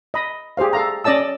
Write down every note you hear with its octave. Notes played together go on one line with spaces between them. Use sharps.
D#5 B5
G4 G#4 C5 F5
A4 F5 A#5
C#4 D5 D#5 A5 E6